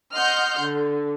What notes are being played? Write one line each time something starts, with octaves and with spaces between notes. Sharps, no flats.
D#5 F#5 C6 F6 G6
D3